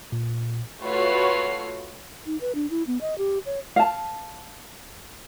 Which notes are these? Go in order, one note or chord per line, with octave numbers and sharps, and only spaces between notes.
A#2
A3 F4 F#4 B4 C#5 C7
D#4
B4
D4
E4
B3
D#5
G4
C#5
F5 A5